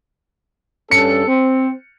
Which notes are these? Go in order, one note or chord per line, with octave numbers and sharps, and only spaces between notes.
G2 C#4 A4 C#7
C4